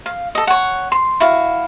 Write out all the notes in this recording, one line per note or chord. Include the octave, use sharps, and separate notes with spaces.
F5
A4 D#5
C#5 F#5
C6
E4 F#4 F5